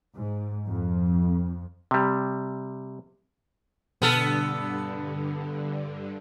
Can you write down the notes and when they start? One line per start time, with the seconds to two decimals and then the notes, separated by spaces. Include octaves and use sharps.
0.15 G#2
0.68 F2
1.91 C3 G3
4.02 G2 B2 D3 B3 A4 F6 D#7